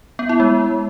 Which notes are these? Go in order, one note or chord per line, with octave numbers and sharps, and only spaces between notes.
B3
E4
G#3